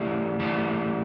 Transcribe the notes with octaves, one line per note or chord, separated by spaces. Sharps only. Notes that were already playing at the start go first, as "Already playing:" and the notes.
Already playing: E3 A3 E4 G4 D5
E3 A3 E4 G4 D5